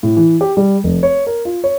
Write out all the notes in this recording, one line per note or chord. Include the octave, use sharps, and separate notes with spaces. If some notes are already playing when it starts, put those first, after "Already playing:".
A2
E3
G4
G3
F1
C#5
A#4
F4
C#5